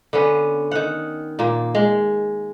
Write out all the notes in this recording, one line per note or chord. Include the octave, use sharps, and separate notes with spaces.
D3 B3 C#4
D#3 F#5
A#2 A#3
G#3